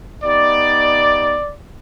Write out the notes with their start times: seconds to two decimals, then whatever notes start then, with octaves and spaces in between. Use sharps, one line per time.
0.24 B3 D#4 G4 D5